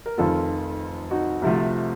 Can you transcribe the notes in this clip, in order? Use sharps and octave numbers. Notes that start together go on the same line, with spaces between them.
A#4
F1 F2 D#3 F4 A4
D#4 F#4
C2 C3 F3 A3